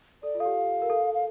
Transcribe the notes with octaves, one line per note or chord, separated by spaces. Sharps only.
A4 D5
F4
A4 F5
G4
A#4
A4
F5